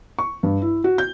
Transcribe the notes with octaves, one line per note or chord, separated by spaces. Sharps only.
C#6
G2
E4
F#4
G6